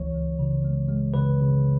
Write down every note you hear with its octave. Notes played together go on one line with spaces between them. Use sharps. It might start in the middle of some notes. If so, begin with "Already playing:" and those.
Already playing: C#2 E3 C#5
C#2
C#3
G#3
G#3
C#3 B4
C#3